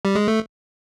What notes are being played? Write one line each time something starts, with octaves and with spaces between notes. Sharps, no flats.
G3
G#3
A3